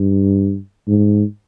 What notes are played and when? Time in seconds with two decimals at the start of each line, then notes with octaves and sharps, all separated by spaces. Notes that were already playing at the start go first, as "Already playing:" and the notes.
Already playing: G2
0.88 G#2